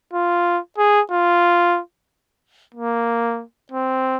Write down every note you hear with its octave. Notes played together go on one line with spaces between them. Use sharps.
F4
G#4
F4
A#3
C4